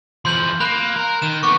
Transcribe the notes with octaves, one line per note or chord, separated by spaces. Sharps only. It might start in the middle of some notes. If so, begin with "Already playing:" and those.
E2 F3 C6 G6 F#7
A#3 B5 F#6
A#4
D#3 E7
A3 B3 C#6 D6